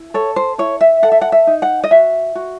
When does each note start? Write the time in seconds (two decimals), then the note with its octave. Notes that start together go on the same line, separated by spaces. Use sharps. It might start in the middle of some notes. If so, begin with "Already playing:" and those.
Already playing: E4
0.14 A4 C#5
0.36 C5
0.58 E4 C#5
0.81 E5
1.02 A4 F#5
1.12 E5
1.21 F#5
1.32 E5
1.47 D#4
1.62 F#5
1.84 D#5
1.91 F#4 E5
2.35 F#4